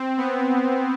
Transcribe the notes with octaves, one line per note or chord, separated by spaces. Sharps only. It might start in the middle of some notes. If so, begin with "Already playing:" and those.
Already playing: C4
B3